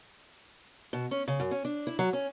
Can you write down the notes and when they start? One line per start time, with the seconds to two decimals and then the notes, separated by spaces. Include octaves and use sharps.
0.93 B2
1.11 C#4
1.28 C#3
1.40 F#2
1.51 C#4
1.65 D4
1.87 E4
1.99 F#3
2.13 C#4